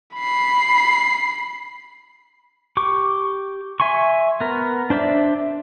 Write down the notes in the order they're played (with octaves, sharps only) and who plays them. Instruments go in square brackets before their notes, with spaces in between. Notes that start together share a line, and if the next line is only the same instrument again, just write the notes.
[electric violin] B5 C7
[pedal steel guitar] G4 C#6 D6
E5 G#5 C6 C#6
B3 A#4
D4 C5 D5 E5